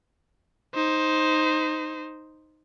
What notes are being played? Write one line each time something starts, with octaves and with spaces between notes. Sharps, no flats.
D#4 C5